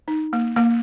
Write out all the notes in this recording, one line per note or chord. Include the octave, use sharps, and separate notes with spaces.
D#4
A#3
A#3